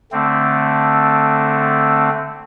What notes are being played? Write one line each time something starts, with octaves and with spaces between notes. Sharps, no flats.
D3 A3 C4